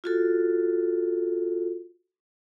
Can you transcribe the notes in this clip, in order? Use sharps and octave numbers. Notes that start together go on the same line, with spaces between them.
F4 F#4 A4